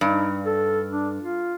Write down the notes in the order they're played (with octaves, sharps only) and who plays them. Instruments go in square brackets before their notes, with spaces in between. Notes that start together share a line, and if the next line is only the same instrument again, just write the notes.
[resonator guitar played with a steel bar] G2 [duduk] D#4
[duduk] A4
D4
F4